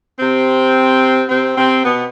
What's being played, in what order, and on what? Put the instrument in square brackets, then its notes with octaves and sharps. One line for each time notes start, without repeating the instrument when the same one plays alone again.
[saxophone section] C3 C4
C3 C4
C3 C4
B2 B3